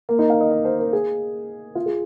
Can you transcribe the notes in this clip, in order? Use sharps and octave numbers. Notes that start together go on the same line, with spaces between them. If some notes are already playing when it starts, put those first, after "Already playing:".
A#3
D#4
F5
D#5
D#5
C5
A#4
G#4
F4
G#4